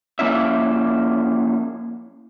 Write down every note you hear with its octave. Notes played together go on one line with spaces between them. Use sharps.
F3 A#3 C#4 E4 E5